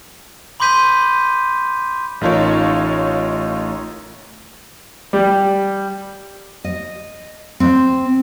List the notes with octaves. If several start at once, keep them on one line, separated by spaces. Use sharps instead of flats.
B5 C6 D6 G6 B6 D#7
A1 A3 D#4 F4 A#4 C#5
G3
D#5
C4